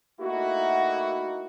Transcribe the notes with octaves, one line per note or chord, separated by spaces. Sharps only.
A3 A#3 D#4 E4 F#4